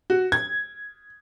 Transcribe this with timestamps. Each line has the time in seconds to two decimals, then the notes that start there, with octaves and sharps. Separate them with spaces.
0.10 F#4
0.32 G#6